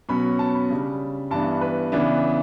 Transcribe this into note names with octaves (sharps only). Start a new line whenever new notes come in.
B2 F#3 C#4 B5
A5
B5
C#3 G3 D4
G2 E3 B3 D4 A5
B4
C#3 E3 B3 D4